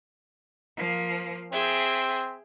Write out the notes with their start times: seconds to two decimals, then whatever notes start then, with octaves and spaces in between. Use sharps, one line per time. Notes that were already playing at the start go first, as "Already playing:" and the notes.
0.77 F3 A#3
1.51 C4 G#4 E5 G5